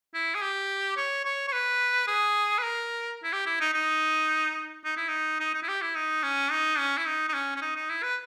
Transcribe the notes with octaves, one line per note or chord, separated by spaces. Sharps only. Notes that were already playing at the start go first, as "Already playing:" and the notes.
E4
G#4
G4
C#5
C#5
C#5
B4
G#4
B4
A#4
E4
G4
E4
D#4
D#4
D#4
E4
D#4
D#4
D#4
E4
G4
E4
D#4
C#4
D#4
C#4
E4
D#4
D#4
C#4
C#4
D#4
D#4
E4
B4